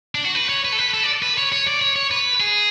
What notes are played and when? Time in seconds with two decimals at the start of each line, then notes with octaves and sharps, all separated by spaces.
0.15 D4
0.25 F#4
0.35 B4
0.49 C#5
0.65 B4
0.72 A4
0.79 B4
0.94 A4
1.03 D5
1.23 B4
1.38 C#5
1.53 C#5
1.67 D5
1.82 C#5
1.96 C#5
2.11 B4
2.40 G#4